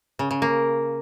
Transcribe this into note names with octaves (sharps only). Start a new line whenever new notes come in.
C#3
C#3
A#3